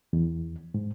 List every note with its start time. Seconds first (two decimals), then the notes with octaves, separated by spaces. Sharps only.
0.13 E2
0.74 G#2